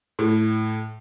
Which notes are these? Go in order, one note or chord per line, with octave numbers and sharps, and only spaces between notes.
A2